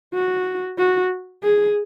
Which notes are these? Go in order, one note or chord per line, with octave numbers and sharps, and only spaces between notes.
F#4
F#4
G#4